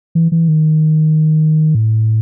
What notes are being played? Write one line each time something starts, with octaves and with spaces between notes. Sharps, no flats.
E3
E3
D#3
A2